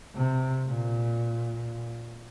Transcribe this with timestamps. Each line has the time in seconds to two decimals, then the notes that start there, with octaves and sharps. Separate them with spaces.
0.15 C3
0.68 A#2